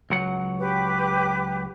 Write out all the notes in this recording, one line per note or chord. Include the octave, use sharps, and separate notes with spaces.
C#2 F#3 F#5
G4 B4 D6